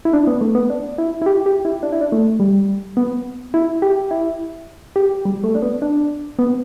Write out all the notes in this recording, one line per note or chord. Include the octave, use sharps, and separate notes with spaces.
E4
D4
B3
A3
B3
D4
E4
E4
G4
G4
E4
D4
E4
D4
A3
G3
B3
E4
G4
E4
G4
G3
A3
D4
B3
D4
B3